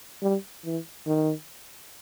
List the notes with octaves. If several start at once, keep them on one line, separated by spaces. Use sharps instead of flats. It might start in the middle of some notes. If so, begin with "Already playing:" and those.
G3
E3
D#3